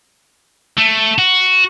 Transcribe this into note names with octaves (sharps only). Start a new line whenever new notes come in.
A3
F#4